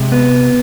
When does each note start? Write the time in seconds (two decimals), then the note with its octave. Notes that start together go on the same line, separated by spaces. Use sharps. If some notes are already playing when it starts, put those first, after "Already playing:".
Already playing: C3 G#3
0.12 B3